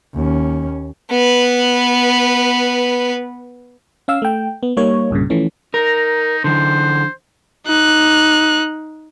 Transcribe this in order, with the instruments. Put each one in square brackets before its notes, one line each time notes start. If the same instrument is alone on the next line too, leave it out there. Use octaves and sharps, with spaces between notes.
[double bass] D#2 C#4
[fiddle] B3 B4
[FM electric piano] C#4 F5 E6
A3 G5
B3
G3 A#3 D#4 C#5
C2 G2 A#2 C#3
E3 F3 A3 C#4
[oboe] D#4 [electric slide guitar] A#4
[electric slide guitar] D3 E3 [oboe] C5
[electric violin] D#4 F#6